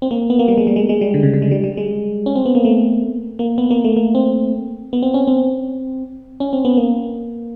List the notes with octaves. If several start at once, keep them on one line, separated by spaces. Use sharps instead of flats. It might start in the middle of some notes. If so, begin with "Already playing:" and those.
C4
A#3
B3
A#3
G3
G#3
G3
G#3
G#3
G3
D3
C#3
D3
G#3
G3
G3
G#3
C#4
C4
B3
A#3
A3
A#3
B3
A#3
A3
A#3
C4
B3
C4
C#4
C4
C#4
C4
B3
A#3